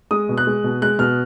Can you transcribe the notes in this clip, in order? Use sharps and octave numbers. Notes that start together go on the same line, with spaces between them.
G#3 D#6
B2
F#6
G#3
B2
G#3 F#6
B2 F6